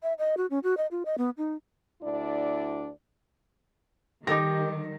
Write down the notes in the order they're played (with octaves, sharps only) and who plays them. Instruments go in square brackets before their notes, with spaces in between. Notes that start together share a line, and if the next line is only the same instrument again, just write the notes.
[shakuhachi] E5
D#5
F#4
C#4
F#4
D#5
F4
D#5
B3
D#4
[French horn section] D2 D4 E4 D5
[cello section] D#3 G3 [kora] D#4 A4 A#4 [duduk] G4 [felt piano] D6 A#6